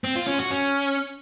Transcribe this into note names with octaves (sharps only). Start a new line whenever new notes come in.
C4
F4
C#4
F#4
C#4